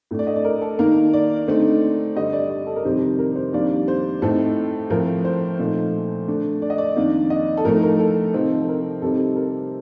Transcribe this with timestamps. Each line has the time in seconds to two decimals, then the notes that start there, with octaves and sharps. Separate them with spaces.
0.11 A2 A3 D4
0.19 D5
0.27 D#5
0.36 D5
0.45 A#4
0.62 A4
0.79 D#3 A#3 D#4 A#4
1.13 D5
1.47 D3 A3 C4 D#4
2.16 G2 D3 G3 D#5
2.33 D5
2.50 D5
2.67 A4
2.76 A#4
2.85 F2 C3 D#3 G3 C5
3.19 A#4
3.36 C5
3.53 F2 D#3 G3 A#3 D4 D5
3.88 C5
4.22 A2 A3 C4 D#4 A4
4.90 A2 F3 C4 A#4
5.25 C5
5.59 A#2 F3 A3 C4 D#4
6.28 D3 A3 D4
6.62 D5
6.70 D#5
6.78 D5
6.96 F2 D#3 A#3 D4
7.30 D#5
7.57 A4
7.64 A2 F3 A3 D#4 A#4
7.83 A#4
7.99 A4
8.34 C3 F3 C4 D#4
8.60 A4
8.69 A#4
9.02 C3 G3 C4 D#4 A4
9.36 A#4